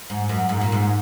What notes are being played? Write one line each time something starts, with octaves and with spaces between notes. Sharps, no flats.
G#2
F#2
G#2
A#2
G#2